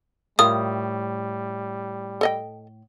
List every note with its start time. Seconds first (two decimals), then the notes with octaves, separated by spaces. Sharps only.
0.39 A2 G3 F4 A#4 D#6
2.21 A4 D#5 G5